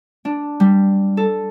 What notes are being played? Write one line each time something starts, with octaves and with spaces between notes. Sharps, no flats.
D4
G3
A4